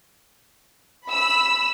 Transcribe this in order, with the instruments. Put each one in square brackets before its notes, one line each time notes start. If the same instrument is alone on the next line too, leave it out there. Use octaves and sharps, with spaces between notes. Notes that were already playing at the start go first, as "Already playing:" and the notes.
[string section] B5 E6